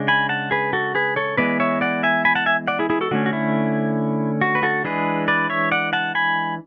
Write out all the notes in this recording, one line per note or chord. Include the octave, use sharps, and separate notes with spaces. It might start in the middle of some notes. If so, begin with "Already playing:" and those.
Already playing: C#3 G#3 D4
G#5 B5
F#5 A5
G#4 B4
F#4 A4
G#4 B4
A4 C#5
E3 G#3 B3 B4 D5
C#5 E5
D5 F#5
E5 G#5
G#5 B5
F#5 A5
E5 G#5
D5 F#5
E4 G#4
E4 G#4
F#4 A4
D3 A3 C#4 F#4
F#4
E4
F#4
B4
F#4 A4
E3 G#3 D4 G#4 B4
B4 D5
C#5 E5
D5 F#5
F#5 A5
G#5 B5